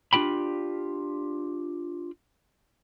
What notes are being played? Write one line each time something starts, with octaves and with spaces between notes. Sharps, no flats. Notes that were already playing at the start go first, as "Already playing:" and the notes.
D4 F4 G4 G5 B5